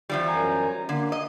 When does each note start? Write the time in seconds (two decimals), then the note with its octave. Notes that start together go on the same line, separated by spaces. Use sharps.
0.09 E2 F3 G3
0.28 F#2 G#5 A#5
0.89 D3 A#3
1.12 D#5